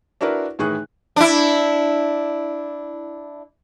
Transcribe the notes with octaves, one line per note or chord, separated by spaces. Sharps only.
D4 E4 F#4 A#4 B4
A2 D#3 E3 G#4 C#6 F#6
D4 E4